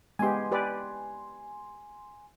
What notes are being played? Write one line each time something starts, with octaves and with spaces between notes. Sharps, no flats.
G#3 B3 G4 G#5 C6
G4 B4 D5